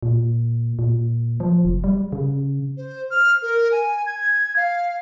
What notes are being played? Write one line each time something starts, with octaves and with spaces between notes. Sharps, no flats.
A#2
A#2
F3
F1
G3
C#3
C5
F6
A#4
G#5
G#6
F5